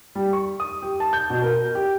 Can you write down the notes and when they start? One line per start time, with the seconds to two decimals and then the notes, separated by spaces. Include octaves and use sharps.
0.15 G3
0.33 C#6
0.60 D#6
0.82 G4
1.00 A5
1.13 G6
1.30 B2
1.42 A#4
1.75 G4